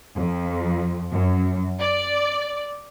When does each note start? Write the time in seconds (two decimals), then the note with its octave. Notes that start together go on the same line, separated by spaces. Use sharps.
0.15 F2
1.11 F#2
1.80 D5